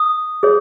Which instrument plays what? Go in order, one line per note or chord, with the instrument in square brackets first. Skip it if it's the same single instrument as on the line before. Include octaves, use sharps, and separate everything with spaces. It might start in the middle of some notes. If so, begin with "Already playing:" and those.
Already playing: [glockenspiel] D#6
[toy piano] G#4 C#5